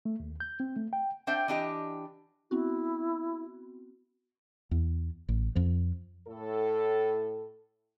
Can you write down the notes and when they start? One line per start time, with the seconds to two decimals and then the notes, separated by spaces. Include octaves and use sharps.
0.05 A3
0.20 D#2
0.40 G6
0.60 C4
0.76 A3
0.93 G5
1.27 C4 D4 C5 E5 F#5 G5
1.48 E3 D4 G4 D#5
2.51 B3 C4 E4 F#4
4.71 E2
5.29 A1
5.55 F2 F3
6.28 A2 A4